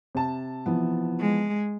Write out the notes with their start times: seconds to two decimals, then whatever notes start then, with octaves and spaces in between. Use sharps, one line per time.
0.15 C3 A5
0.66 E3 F3 B3
1.20 G#3